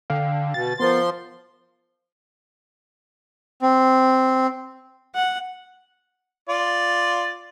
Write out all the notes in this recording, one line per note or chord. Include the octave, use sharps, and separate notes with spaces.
D3 F5 G5
B2 A6
F3 B3 A#4 C5 C6
C4
F#5
F4 D5